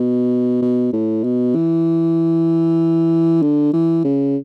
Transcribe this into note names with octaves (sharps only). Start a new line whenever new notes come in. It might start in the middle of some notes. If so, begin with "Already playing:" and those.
Already playing: B2
B2
A2
B2
E3
D3
E3
C#3